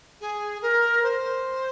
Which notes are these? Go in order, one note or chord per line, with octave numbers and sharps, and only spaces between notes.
G#4
A#4
C5